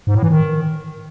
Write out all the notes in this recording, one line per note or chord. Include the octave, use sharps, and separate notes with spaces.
G#2
A2
E3
D#3